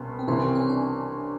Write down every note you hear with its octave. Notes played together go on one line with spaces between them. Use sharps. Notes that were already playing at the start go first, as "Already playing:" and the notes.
Already playing: C2 B2 C#4
C4
C2 C3 E3 C#4
C4
C#4
D4